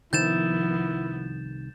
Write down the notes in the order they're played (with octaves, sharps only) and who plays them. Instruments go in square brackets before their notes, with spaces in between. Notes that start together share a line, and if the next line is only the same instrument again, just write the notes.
[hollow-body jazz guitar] C2 D#3 [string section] F3 B3 [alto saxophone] E4 [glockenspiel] G6 A6 E7